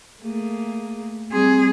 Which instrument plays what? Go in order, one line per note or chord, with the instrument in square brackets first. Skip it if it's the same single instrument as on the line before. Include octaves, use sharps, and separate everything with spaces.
[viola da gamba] A3 A#3 G#4
[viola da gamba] G3 [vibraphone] C4 [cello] G#4